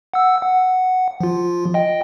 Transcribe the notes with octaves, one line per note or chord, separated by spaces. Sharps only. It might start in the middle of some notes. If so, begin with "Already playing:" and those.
F#5 E6
F#5
F3 F4
D#5 G5